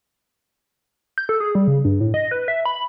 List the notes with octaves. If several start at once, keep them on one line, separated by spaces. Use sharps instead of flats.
G6
A4
G#4
G3
C#3
G2
A2
D#5
B4
E5
B5